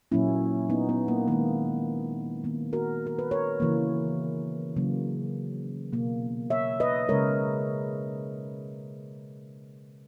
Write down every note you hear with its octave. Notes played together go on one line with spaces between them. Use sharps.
A#2 F#3 A#3 C#4 E4
B3 D#4
B3
A#3
D#3 G#3 A#3
D#3 A#3 B3
F#4 A#4
A#4
B4
A#4 C#5
C#3 E3 A#3
C#3 F#3 A#3
B2 A#3
C#5 E5
B4 D#5
C#3 G#3 A#4 C#5